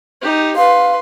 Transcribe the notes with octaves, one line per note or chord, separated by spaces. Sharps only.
D#4 G4
B4 F5 C6